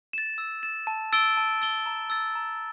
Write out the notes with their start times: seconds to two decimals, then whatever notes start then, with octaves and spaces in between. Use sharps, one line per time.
0.13 A6 E7
0.38 E6
0.63 A6 E7
0.87 A5
1.13 E6 A6 D7 G7
1.37 A5
1.61 E6 A6 D7 G7
1.86 A#5
2.10 E6 A6
2.35 A#5